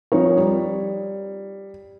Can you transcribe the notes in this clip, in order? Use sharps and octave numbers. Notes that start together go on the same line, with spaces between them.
F3 C4 D#4 C#5
G3